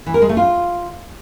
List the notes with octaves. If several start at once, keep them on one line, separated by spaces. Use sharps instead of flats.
E3
A#4
G#3
A3
F4